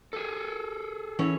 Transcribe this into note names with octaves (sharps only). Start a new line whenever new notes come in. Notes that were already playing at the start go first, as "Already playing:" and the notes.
G#4 A4
E3 C#4 C#5